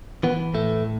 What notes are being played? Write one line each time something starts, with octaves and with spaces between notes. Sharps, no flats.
E3 B3
A2 A3